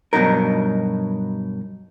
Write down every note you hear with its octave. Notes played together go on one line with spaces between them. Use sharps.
G2 B2 E3 F#3 D#4 A#4